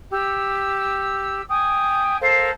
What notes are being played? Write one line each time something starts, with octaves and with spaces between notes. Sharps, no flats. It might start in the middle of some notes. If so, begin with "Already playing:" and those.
G4 E6
G5 G#5 D#6
A4 A#4 C5 F5